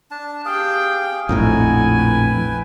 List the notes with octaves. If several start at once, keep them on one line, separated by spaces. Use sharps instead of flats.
D4 A5
G4 G#4 F5 G5
A#1 F2 A2 D#4 E4 F#4 G#5
B4 G5